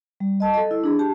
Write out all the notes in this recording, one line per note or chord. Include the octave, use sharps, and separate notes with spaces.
G3
D#5 A5
A4 D#5
E4
D4 G#4
G4 A5